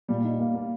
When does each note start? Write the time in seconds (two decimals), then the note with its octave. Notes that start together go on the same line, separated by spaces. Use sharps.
0.08 A#2 G3
0.24 D#4
0.40 A#3
0.55 A#3